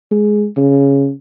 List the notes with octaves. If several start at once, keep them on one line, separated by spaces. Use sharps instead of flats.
G#3
C#3